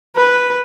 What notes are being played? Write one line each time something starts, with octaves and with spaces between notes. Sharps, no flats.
B4